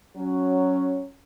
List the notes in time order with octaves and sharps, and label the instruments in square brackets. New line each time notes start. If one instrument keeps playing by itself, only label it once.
[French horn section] F#3 C#4